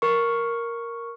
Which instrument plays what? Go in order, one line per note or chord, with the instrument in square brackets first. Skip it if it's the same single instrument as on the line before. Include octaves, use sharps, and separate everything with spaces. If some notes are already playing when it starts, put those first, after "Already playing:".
[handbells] A#4 C#6